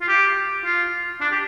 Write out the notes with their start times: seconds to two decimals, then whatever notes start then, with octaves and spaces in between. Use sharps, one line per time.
0.01 F4
0.08 G4
0.65 F4
1.21 D4
1.32 G4